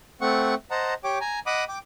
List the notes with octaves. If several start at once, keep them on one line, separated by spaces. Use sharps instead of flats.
A3 C4 F#5 C#6
C5 D#5 F#5 A5 A#5
G4 C#5 G5 D6
G#5 A#5
D#5 F#5 B5 D6 D#6
G5 D6